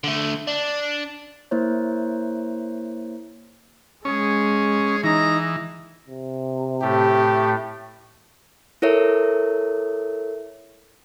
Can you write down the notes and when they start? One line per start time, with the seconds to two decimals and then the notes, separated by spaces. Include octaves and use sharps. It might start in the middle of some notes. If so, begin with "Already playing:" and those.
0.04 D3 A3
0.47 D4
1.51 A#3 E4 C5 C#5
4.05 G#3 C#4 G#4
5.04 E3 D#4 A#5
6.08 C3
6.82 A2 A3 G4
8.82 E4 A4 A#4 C#5 E5